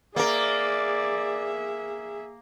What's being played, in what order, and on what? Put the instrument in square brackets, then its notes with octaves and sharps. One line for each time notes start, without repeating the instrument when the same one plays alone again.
[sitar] A#3 A#4 [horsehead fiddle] G#4 E5 [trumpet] D5